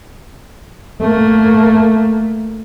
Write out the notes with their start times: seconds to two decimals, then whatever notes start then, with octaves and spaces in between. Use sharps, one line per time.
1.01 A3 A#3